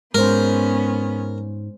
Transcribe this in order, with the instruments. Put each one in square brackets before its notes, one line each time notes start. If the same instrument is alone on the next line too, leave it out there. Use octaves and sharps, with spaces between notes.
[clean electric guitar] G#2 [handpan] G#3 C5 [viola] B3 C#4 [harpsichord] A#4